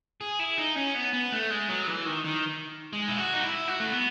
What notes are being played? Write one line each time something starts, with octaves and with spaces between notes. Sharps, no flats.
G#4
E4
D#4
C#4
B3
B3
A3
G#3
F#3
E3
D#3
D#3
G#3
E4
F#4
D#4
E4
F#4
A3
B3